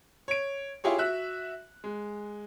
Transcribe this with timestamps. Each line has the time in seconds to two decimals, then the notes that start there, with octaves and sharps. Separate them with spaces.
0.28 C#5 D7
0.84 E4 F4 G4 G#4 C#5
0.98 F#4 E5 F#6
1.84 G#3